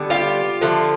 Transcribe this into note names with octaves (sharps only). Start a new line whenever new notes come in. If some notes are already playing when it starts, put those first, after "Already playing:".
Already playing: D3 G3 B3
F4 G4
D3 F3 A3